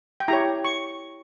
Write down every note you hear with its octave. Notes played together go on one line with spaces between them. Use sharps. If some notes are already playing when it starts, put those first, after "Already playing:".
G5
E4 G4 C#5 A#5
C#6